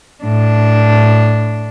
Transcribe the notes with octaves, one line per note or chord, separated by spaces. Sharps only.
A2 D4